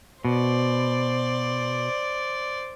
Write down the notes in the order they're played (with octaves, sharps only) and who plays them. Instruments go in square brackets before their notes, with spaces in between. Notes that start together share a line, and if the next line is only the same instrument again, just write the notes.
[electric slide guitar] B2 [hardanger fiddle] C5 D5